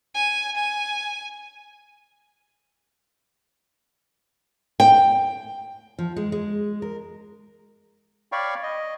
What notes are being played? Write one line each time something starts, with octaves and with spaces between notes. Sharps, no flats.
G#5
G#5
G5
F3
G#3
G#3
A#4
C#5 D5 F5 G5 B5 C#6
D#5